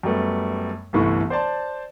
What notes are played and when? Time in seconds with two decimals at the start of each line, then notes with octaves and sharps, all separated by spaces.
0.03 F#2 G3 A3 B3
0.93 G1 C2 E3 A3 C#6
1.30 C5 D5 A5 C6